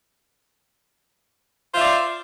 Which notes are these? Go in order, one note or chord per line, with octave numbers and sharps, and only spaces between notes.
F4 C5 D5 E5